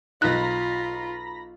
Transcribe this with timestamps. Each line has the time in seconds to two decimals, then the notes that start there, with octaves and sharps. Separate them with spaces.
0.22 B1 D#4 F4 A#5 B5 F#6 A#6